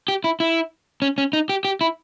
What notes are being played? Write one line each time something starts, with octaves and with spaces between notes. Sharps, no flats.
G4
E4
E4
C#4
C#4
D#4
G4
G4
E4